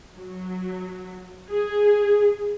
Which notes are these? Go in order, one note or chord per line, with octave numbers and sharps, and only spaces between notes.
F#3
G#4